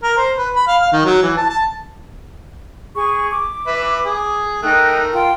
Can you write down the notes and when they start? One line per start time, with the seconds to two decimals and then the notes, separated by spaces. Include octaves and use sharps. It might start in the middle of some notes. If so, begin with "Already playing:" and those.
0.03 A#4
0.17 C5
0.38 B4
0.56 B5
0.67 F5
0.81 F5
0.93 D#3
1.05 F#3
1.22 E3
1.37 A5
1.50 A5
2.96 G#4 C#6
3.30 D6
3.67 B4 E5
4.05 G#4
4.63 A3 D#4 A#4 G5 F#6
5.14 F4 G5